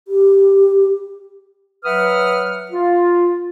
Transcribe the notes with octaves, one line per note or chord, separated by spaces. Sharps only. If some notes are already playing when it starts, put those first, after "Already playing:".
G4
F#3 B4 E5 F#5 D#6 F6
F4